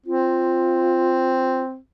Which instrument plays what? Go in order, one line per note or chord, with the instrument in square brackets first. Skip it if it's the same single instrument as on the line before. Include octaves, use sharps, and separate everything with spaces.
[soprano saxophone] C4 [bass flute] F4